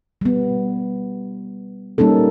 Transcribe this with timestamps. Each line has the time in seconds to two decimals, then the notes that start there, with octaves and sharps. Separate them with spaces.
0.21 G3 B3
1.98 G3 A#3 C#4 D#4 A4